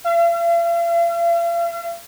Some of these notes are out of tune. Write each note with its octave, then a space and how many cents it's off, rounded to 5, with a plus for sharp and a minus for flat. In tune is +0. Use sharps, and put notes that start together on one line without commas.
F5 -45